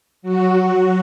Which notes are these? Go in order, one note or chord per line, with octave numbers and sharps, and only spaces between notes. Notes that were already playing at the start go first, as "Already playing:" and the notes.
F#3 F#4